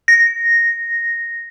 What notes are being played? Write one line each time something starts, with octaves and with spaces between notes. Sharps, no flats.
A#6